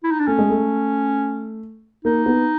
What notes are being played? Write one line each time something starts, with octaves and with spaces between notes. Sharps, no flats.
E4
D#4
D4
A3 C#4
G#3
A3
A#3 D#4
B3